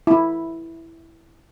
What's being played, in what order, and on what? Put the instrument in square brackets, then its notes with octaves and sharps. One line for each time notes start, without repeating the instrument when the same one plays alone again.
[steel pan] E4